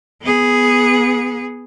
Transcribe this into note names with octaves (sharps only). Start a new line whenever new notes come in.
B3 G#4